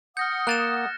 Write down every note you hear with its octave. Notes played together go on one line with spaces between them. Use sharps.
F#5 D#6 F6 G6 A#6 C#7
A#3 F#6 A6 E7